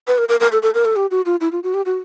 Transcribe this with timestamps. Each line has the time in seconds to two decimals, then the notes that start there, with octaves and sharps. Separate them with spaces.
0.07 B4
0.18 A#4
0.29 A#4
0.40 A#4
0.52 A4
0.62 A4
0.74 A#4
0.85 A4
0.96 G4
1.11 F#4
1.26 F4
1.41 E4
1.52 F4
1.63 F#4
1.74 G4
1.86 F#4